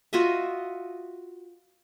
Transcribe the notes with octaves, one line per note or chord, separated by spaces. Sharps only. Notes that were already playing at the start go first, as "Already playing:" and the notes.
F4 F#4 D#5 E5